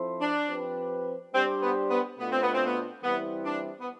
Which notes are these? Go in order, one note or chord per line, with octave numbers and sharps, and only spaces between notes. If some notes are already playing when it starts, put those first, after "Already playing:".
Already playing: F3 C4 E4 A4 C5
D4
F3 C4 G4 B4
G3 C4 D4 G4 C5
B3
B3
B2 A3 B3 D4 F4
C4
B3
C4
B3
E3 G3 B3 C4 E4
D4
B3